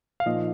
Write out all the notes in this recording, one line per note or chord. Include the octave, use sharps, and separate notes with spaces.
F5
A#2 F3 A#3 D#4 D#5